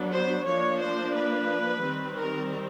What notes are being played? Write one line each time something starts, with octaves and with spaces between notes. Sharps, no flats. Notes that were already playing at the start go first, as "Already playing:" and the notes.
Already playing: F#3 B3 D4
C5
F3 A#3 D4 C#5
C5
B4
D#3 G3 C4
A#4